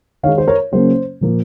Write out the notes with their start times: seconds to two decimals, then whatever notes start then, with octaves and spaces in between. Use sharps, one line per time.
0.23 D#3 G#3 D#4 C#5 F5
0.38 C5
0.47 A#4 C#5
0.72 C#3 F#3 A#3 C#4 C5
1.21 A#2 F3 A#3